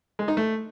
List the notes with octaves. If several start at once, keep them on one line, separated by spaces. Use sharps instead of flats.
G#3
D#4
A3